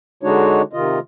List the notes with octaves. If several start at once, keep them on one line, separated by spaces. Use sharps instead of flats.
D3 G#3 D4 D#4 F#4 C#5
C3 D#3 F4 D#5